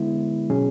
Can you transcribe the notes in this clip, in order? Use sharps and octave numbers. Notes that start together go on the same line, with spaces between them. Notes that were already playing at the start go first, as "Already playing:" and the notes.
Already playing: D3 G#3 B3 E4
B2 F#3 C#4 G#4